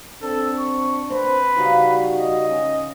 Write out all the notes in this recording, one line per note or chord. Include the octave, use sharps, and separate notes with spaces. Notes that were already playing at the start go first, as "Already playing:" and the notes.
C4 D4 A4
C#6
C4 B4 C5
C#3 G3 D#4 F#4 F5
D#5
C#4